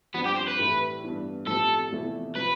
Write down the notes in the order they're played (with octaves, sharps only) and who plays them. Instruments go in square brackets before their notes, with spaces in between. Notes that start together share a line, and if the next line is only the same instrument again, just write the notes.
[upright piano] G2 F3 C4 [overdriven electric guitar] B3
[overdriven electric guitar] G4
C5
B4
[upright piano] A2 E3 A3 E4 G4
G2 E3 B3
[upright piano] A2 F3 C4 G4 [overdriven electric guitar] A4
[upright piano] E2 C3 F3 A3 E4
[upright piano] C3 F3 C4 [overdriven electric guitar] B4